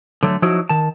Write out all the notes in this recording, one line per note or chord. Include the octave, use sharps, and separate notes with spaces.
D3 F#3 A3
F3 F#3 D#4 E4 F#4
D#3 A5